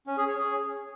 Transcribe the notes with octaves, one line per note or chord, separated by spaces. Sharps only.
C#4
G#4
C#5
G#4